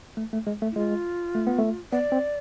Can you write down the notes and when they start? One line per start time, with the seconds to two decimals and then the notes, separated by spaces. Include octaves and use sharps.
0.17 A3
0.33 A3
0.47 G#3
0.62 A3
0.72 E4
0.76 G#3 F4
1.35 A3
1.47 B3
1.58 A3
1.92 B3 D5
2.12 C4